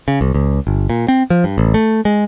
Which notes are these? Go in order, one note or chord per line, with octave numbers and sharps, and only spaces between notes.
C#3
C2
C#2
G1
A#2
C4
F3
G2
A1
A3
G#3